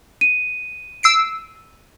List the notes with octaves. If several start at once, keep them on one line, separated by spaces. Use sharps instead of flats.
D#7
E6 C7 D7